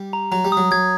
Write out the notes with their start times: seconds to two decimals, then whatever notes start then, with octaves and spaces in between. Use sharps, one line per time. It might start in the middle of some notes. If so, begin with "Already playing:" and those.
Already playing: G3
0.13 A#5
0.32 F#3 A#5
0.45 G3
0.52 D#6
0.57 F#3
0.71 F#3 G#6